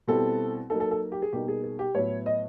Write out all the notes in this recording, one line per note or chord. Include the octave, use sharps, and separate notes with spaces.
B2 G3 C4 E4 A4
F#3 A#3 D#4 A4
A4
A4
G4
G#4
B2 G3 A#3 D#4 G4
G#4
G#4
G4
A2 F#3 B3 E4 C#5
D#5